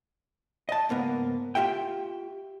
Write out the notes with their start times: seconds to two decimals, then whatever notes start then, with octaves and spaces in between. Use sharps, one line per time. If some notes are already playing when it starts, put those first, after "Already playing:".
0.69 D#5 A5
0.89 C#2 G#2 A#3 B3
1.55 F4 G4 E5 G5